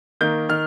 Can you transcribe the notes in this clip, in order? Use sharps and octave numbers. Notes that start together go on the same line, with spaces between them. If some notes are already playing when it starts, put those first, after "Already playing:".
D#3 A#3 G6
D#3 F6